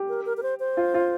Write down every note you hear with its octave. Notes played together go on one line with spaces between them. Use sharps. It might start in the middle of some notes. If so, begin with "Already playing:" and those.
Already playing: G4
A#4
A#4
A#4
C5
C5
F4
F4